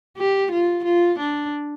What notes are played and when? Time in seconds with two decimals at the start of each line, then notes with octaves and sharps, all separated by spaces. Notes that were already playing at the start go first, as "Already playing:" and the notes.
0.18 G4
0.52 F4
0.85 F4
1.19 D4